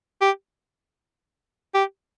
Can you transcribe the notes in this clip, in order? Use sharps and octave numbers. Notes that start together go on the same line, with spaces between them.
G4
G4